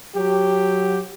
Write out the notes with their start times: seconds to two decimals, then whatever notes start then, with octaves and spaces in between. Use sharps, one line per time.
0.16 F#3 G4